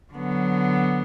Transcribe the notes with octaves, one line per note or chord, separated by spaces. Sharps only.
D3 F#3 B3